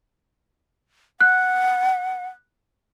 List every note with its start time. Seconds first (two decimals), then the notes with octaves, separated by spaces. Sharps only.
1.21 F#5 F#6